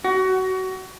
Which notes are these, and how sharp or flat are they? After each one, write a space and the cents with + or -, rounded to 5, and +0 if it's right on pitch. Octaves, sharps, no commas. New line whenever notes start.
F#4 +25